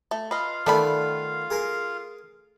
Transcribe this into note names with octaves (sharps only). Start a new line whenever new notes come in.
A3
F4 B4 D#5 F5
D#3 A3 B3 A4 D5 B5
G#4 A#4 G#5